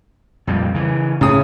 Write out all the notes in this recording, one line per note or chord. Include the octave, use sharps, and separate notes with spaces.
F2 A#2 G3
C#3 E3
A2 C#3 D#6